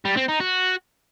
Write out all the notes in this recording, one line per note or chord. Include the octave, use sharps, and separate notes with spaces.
G3
C4
D#4
F#4